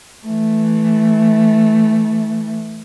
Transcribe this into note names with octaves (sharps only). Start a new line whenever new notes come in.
E3 A3